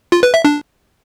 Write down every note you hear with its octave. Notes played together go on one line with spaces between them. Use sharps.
F4
B4
E5
D4